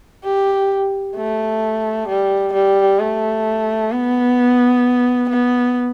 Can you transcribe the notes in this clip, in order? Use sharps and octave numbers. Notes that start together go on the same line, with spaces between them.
G4
A3
G3
G3
A3
B3
B3